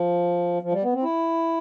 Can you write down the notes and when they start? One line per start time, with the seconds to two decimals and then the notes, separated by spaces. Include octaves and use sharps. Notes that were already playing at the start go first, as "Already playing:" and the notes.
Already playing: F3
0.62 F3
0.72 G3
0.83 B3
0.93 C4
1.03 E4